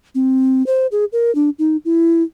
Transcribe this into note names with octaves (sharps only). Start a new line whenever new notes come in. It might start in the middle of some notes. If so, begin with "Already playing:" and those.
C4
C5
G#4
A#4
D4
D#4
E4